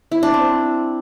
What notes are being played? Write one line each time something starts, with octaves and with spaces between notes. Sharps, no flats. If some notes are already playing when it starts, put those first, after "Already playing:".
E4
D4
C4